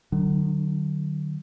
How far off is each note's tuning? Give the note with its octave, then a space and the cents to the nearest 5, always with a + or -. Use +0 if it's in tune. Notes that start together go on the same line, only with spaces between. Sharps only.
D3 +45 F#3 +25 D4 +0